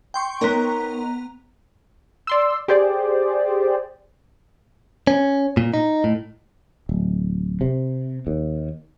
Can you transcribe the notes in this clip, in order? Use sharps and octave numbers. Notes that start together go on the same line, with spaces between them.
G5 C6 C#6
B3 D#4 A#4 C#5 A#5
D5 C6 E6
G4 G#4 C5 D5
C#4
A#2
D#4
A2
D1
C3
D#2